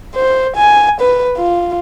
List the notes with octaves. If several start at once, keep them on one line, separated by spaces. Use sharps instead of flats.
C5
G#5
B4
F4